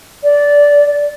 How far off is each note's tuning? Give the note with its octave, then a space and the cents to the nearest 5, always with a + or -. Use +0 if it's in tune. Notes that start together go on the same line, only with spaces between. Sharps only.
D5 -15